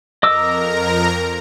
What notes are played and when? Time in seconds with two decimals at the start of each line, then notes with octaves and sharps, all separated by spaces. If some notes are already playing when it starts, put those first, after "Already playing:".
0.23 F2 A#4 D#5 A#5 D6 E6